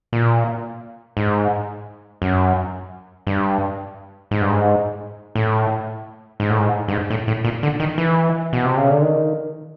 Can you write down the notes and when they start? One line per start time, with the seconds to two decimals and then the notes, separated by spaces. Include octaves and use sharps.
0.13 A#2
1.17 G#2
2.22 F#2
3.27 G2
4.31 G#2
4.41 G2
4.50 G#2
5.35 A2
6.40 G#2
6.50 A2
6.59 G#2
6.88 G2
6.92 G#2
7.10 A2
7.28 A2
7.45 A#2
7.63 D3
7.80 D#3
7.98 E3
8.53 B2
8.65 C3
8.77 C#3
8.90 D3
9.02 D#3